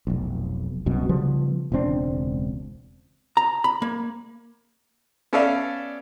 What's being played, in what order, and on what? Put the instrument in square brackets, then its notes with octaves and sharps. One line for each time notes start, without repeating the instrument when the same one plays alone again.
[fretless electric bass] F1 B1
C2 F#2 B2
C#3 F3 G3 B3
E1 C#2 C4 D4
[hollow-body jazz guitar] A#5
B5
A#3
[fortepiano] B3 C#4 A4 D5 E5 F5